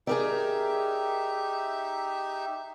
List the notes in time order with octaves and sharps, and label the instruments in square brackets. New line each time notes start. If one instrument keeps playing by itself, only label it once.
[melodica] D#4 G4 E5 [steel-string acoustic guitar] G#4 A#4 D5